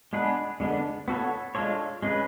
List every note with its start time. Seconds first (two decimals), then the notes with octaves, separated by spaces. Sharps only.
0.13 G#3 B3 D4 G#4 B4
0.60 D3 G#3 B3 D4
1.08 B3 F#4 A4 C#5
1.55 G#3 D4 F4 A4 C#5
2.03 G#3 C#4 G#4 B4